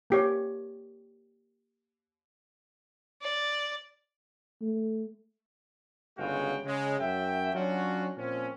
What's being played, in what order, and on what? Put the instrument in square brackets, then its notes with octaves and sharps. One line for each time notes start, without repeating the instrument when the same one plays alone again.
[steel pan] A#3 G4 C#5
[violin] D5
[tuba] A3
[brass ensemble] G1 C#3 G#3 F#4 F5 G5
C#3 G#3
F#2 F#3 E5 G5
F#3 C#4 D4 F4 F#4
A#2 F3 C4 C#4